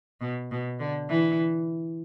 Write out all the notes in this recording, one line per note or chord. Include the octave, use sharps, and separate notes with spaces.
B2
B2
D3
E3